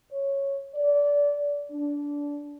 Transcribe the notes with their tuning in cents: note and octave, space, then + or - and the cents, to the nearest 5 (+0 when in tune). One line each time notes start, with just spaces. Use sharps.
C#5 -5
D5 -25
D4 -20